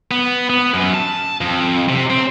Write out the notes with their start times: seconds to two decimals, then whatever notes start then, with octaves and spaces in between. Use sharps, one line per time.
0.11 B3
0.50 B3
0.74 F#2
0.94 A5
1.41 F2
1.89 C3
2.10 C4